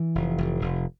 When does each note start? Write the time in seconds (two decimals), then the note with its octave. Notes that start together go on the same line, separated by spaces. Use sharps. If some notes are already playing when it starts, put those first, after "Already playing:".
Already playing: E3
0.15 F1
0.38 F1
0.61 F1